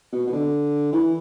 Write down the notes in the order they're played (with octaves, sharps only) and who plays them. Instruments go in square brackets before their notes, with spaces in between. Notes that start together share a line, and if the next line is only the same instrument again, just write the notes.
[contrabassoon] B2
B2
D3
E3